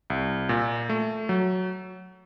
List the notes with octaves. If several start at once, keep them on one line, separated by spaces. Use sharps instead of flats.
C2
A#2
A3
F#3